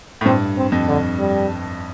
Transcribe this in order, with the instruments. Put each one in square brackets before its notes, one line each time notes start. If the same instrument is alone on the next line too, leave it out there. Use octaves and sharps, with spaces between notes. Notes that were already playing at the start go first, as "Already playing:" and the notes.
[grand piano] A2
[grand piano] G2 [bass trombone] C4
[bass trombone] C4
[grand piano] F2
[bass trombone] D3
G3